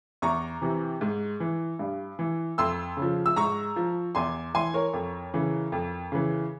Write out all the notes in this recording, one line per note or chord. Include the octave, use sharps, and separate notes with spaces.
E2 A#5 C#6
C3 E3
G#2
E3
G2
E3
F2 C6 E6
C#3
F3
E6
G#2 A#5 C#6
F3
E2 G#5 C6
E3 G#5 C6
A#4 C#5
F2
C#3 E3
F2
C#3 E3